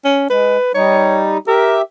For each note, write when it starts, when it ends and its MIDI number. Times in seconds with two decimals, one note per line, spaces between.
0.05 0.28 61
0.30 0.57 56
0.30 0.72 71
0.75 1.38 55
0.75 1.38 63
0.75 1.20 73
1.48 1.82 67
1.48 1.78 70
1.48 1.82 76